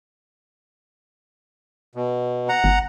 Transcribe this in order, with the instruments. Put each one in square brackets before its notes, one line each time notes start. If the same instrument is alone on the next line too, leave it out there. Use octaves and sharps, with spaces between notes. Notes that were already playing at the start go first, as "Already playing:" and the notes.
[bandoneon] B2
F#5 A#5
[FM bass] G1